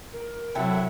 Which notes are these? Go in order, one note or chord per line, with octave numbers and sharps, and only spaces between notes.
A#4
A2 C3 F#3 E4 A4 E5 F#5 G5